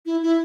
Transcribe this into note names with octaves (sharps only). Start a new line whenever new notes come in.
E4
E4